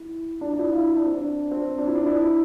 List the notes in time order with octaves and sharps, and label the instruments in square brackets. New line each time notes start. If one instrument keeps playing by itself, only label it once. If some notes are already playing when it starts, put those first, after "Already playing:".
Already playing: [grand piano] E4
D4
D4
E4
F4
E4
D4
C4
D4
C4
D4
E4
D4
E4